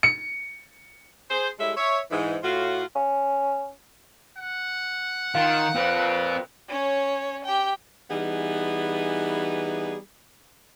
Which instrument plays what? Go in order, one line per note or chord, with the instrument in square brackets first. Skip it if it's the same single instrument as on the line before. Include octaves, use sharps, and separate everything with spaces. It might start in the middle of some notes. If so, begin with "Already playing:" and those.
[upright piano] C#7
[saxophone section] G#4 C5
G3 G#3 E4 A4 C#5 E5
C#5 E5
G#2 E3
A2 F4 F#4
[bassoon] C#4
[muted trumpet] F#5
[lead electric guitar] D#3 [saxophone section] F4 [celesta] F5
[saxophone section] A#2 B4 [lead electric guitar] C4 F4
[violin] C#4 C#5
G4 G5
[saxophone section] E3 G3 B3 D#4 G#4